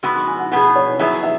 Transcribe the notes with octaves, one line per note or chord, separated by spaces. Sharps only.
G#3 B3 F#4 E6
B5
G#5
F#5
B2 B3 G#4 F#5
C#5
F#3 B3 E4 G#4 E5
E5